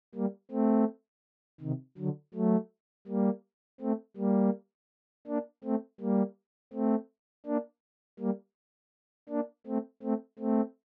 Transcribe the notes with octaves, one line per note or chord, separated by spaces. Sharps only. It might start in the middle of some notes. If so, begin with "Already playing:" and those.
G3 A#3
A3 C4
C3 D#3
D3 F#3
F#3 A3
G3 A#3
A3 C4
G3 A#3
A#3 D4
A3 C4
G3 A#3
A3 C4
A#3 D4
G3 A#3
A#3 D4
A3 C4
A3 C4
A3 C4